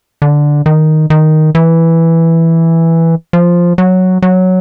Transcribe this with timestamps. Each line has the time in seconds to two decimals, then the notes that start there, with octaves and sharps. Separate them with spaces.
0.22 D3
0.66 D#3
1.10 D#3
1.55 E3
3.33 F3
3.78 F#3
4.22 F#3